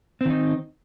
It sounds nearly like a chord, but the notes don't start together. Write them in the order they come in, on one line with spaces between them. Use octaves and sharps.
C4 D#3 D#4